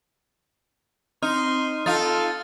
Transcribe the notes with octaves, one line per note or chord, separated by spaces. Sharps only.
C4 D#4 C6 F6
D#4 F4 A4 A6